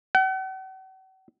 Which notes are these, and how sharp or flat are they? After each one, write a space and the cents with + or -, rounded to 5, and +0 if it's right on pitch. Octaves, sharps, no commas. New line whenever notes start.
F#5 +45